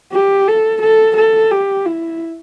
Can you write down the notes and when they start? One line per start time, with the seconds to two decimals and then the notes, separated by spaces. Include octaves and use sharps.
0.13 G4
0.48 A4
0.82 A4
1.17 A4
1.51 G4
1.86 E4